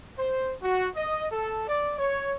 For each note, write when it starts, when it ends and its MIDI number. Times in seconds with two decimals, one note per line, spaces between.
0.18 0.53 72
0.62 0.88 66
0.96 1.26 75
1.31 1.66 69
1.67 1.98 74
1.98 2.35 73